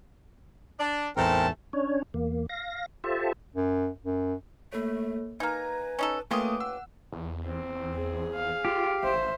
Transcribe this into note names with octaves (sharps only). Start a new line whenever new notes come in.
D4
A1 E2 G#2 A3 C4 A#4 A5
C#4 D4 C#5
E2 A#3
F5 A#6
F4 G4 A4 C5 E5 A5
F#2
F#2
A3 A#3 A4 C#5
A#3 D#4 B4 G#5 A#5 G#6
C#4 D#4 A4
A3 A#3 C#4 F4 G4 B4 D6 D#6
F#5 E6
E2
C4
G#4
F5
F4 G4
A1 C5 E5